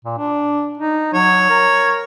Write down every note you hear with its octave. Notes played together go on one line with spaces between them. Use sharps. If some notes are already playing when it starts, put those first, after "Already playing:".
A#2
D4
D#4
F#3 C#5
A#4